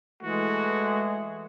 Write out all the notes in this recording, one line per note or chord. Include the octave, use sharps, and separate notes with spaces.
E3 G#3 A3 F#4